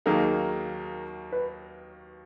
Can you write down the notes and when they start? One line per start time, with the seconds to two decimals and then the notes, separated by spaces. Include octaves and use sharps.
0.06 D#2 D#3 F#3 A#3 D#4 G#4 A#4
1.32 B4